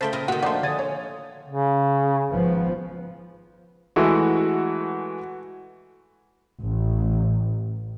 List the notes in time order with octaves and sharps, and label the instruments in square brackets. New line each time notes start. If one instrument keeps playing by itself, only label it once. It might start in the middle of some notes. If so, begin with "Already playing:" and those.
[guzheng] C#3 A3 G5 [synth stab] C5 A5 B5
[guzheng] A#2 A#4 D#5
[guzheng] A#2 D#3 [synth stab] F#4 B6 [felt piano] F#5
[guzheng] F3 A3 [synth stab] D4 D#4 C5 [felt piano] F#5
[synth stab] D3 G#5 D#6 [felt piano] A6
[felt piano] C#5
[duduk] C#3
[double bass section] G#1 F3 B3
[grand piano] E3 G#3 A3 [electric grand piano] F#4
[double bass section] A1